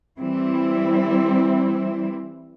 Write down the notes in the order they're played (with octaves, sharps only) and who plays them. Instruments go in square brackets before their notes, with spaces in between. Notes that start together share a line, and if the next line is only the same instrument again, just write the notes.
[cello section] E3 G3 C4 E4